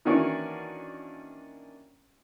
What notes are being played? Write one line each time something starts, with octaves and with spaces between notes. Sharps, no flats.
D#3 E3 A#3 C#4 D4 F#4